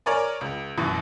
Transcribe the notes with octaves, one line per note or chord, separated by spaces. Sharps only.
A#4 C#5 D5 G#5
C#2
A1 F#2 B2 E3